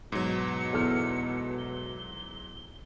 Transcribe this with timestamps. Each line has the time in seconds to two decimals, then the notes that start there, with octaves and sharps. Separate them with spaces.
0.12 G#2 B2 F#3 C#7
0.73 E2 A4 F6
1.58 G7